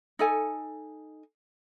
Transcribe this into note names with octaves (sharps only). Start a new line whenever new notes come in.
D#4 A4 G#5